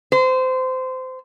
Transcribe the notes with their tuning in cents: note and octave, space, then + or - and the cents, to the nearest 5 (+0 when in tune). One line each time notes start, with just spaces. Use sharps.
C5 -25